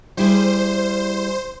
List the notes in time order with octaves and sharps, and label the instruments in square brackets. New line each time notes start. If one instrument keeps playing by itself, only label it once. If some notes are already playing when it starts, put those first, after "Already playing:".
[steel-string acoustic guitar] G3 E4 G#4 [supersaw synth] C5